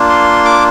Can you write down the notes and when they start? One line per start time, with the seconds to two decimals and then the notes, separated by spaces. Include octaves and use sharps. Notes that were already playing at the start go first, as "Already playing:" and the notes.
Already playing: A#3 D4 F4
0.10 C6
0.45 D6